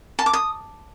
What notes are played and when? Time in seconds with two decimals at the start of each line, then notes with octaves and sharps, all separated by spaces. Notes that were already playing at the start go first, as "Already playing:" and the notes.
0.19 A5
0.26 D6
0.33 D#6